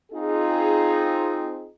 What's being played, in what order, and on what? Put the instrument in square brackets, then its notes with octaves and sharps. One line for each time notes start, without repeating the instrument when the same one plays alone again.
[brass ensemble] C4 D#4 F4 G#4